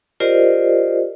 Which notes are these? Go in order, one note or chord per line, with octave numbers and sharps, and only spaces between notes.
F4 G4 A#4 C5 D5 D#5